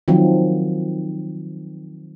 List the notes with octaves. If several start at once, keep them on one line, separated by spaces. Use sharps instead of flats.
D#3 F3 F#3 C4